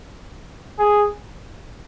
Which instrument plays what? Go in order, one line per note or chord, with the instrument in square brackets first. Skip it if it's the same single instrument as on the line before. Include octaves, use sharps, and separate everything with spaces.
[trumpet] G#4